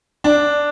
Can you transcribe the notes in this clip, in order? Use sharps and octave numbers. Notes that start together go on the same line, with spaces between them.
D4